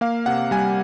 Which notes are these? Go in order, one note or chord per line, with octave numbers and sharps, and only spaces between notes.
A#3 F5
C3 F#5
G3 G#5